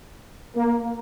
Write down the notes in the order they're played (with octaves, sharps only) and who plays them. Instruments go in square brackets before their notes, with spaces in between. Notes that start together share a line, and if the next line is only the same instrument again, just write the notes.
[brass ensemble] A#3